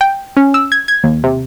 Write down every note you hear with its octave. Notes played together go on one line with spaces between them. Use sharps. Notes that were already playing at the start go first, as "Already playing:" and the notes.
G5
C#4
E6
G#6
G#6
D#2
C3